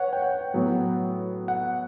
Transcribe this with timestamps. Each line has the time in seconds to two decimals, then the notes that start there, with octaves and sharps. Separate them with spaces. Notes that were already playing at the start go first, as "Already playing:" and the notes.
Already playing: B4 C#5 F#5
0.13 G5
0.22 F#5
0.54 A2 F#3 B3
1.48 F#5